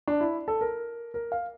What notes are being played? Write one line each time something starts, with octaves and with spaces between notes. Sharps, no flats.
D4
E4
A4
A#4
A#4
F5